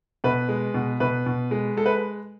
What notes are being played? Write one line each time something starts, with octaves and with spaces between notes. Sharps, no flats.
B2 B4
G#3
B2
B2 B4
B2
G#3
G#3 A4
B4